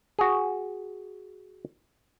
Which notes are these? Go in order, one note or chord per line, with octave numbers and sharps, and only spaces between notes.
F#4 G#4